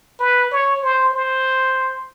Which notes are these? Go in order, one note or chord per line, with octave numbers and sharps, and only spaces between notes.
B4
C#5
C5
C5